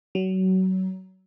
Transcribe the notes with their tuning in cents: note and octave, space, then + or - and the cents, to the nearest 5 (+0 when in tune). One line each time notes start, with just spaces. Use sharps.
F#3 +25